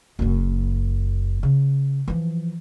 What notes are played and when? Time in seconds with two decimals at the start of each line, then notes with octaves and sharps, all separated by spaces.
0.19 F#1 F#2
1.43 C#3
2.08 E3 F3